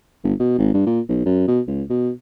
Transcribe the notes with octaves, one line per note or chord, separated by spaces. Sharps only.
G1
B2
G#1
G2
A#2
B1
F#2
B2
C#2
B2